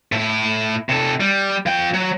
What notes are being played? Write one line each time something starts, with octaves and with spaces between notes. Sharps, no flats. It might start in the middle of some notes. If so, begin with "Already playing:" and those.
A2 E4
C3 A4
G3
F3 G5
F#3